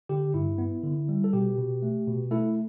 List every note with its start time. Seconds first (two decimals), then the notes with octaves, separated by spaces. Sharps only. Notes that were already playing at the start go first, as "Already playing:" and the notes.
0.09 D3 G4
0.34 G2 E4
0.58 B3
0.83 D3
1.09 G3
1.24 A4
1.33 B2 G4
1.58 B2
1.82 A3
2.07 B2
2.31 A3 E4 A4